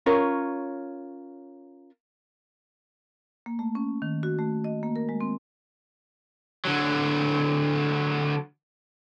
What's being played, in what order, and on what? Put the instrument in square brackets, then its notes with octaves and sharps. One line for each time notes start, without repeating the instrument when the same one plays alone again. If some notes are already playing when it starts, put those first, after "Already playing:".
[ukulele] C#4 F4 A#4 C#5
[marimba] A#3
A3
C#4
D#3
F#4
A3
D#5
A#3
A#4
G#3
C4
[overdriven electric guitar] D3 F#3